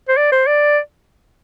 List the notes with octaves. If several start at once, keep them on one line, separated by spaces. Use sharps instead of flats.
C5
D5
C5
D5